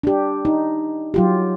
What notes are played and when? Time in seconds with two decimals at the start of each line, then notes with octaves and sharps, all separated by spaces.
0.03 D4 G4
0.45 D#4
1.14 F#3 F4 G4